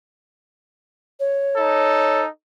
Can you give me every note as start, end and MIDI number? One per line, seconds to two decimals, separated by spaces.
1.19 2.19 73
1.57 2.27 63
1.57 2.27 69